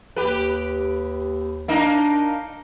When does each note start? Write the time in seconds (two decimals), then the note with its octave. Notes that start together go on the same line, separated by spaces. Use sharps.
0.16 D#2 G4 B4
1.68 A#3 D4 D#4